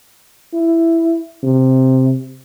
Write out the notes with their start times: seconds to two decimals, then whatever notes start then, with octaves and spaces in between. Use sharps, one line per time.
0.54 E4
1.43 C3